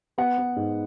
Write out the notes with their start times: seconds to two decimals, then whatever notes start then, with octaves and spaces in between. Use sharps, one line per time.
0.18 B3 F#5
0.38 B3
0.56 G#2